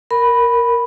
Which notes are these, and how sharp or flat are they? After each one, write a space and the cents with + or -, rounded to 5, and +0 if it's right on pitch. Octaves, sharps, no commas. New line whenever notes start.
A#4 +0 B5 +0